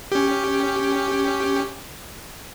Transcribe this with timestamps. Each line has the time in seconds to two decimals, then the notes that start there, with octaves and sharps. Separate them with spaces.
0.12 C#4 G4